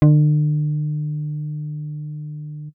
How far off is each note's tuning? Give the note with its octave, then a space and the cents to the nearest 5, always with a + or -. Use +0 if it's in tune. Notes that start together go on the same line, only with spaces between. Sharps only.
D3 +40